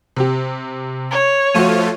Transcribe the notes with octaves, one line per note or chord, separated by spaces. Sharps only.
C3 G4
C#5
F3 A3 F4 F#4 C#6 D#7